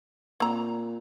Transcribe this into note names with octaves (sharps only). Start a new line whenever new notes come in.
A#2 C4 A#5